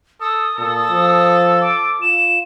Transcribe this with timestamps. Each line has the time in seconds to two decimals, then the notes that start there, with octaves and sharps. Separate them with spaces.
0.21 A4 D#6
0.58 A#2 A4
0.91 F3
1.61 D6
2.02 F4 E7